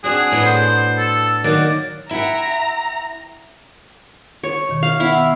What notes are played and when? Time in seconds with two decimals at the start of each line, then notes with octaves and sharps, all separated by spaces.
0.04 C4 D4 F#4 G#4
0.32 A2 B3
0.46 C5
0.98 A4
1.44 D#3 F#3 A#3 D5
2.11 E4 E5 F#5 G5 A#5
4.43 C#5
4.69 B2 D#3
4.83 F5
5.00 B3 E4 F5 F#5